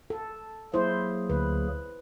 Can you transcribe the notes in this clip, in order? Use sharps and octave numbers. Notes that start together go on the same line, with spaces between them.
A4
F#3 A#3 E4 G#4 C5
D2 B4